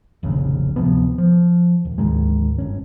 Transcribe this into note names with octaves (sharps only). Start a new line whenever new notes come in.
F1 A#1 D#2 C#3
D1 C3 F3 B3
F3
D#1
D2 G#2 D#3 G#3
G1 C#4